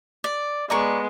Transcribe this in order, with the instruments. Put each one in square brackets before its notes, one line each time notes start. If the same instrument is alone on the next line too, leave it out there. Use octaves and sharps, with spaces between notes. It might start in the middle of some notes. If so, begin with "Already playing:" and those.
[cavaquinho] D5
[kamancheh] G#3 B3 [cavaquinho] D5 A#5 C#6